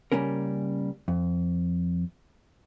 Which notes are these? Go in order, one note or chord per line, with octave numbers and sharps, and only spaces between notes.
C#3 F#3 G3 A#3 C#4 A#4
F2